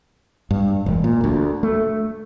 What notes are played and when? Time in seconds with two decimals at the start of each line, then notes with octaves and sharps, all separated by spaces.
0.51 G2
0.86 E1
1.04 A#2
1.24 D2
1.63 A3